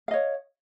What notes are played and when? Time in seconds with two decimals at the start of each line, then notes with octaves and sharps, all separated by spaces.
0.08 F5
0.11 D#5
0.14 C#5